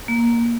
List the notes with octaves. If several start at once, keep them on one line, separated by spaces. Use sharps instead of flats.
A#3